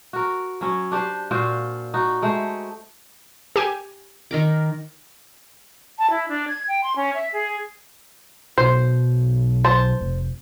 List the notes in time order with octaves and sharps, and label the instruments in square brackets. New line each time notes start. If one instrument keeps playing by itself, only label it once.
[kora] F#4 A#4
F#3 C#4
D4 G4 C5
A#2 F4 F#4 C5
D#4 F#4
G#3 A3 C5
[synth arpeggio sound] G4 G#5
[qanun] D#3 A#4 D6
[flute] A5
E4
D4
G#6
G5
C6
C#4
E5
G#4
[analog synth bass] B1 [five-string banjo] C5
[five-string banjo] C5 A5
[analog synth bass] F1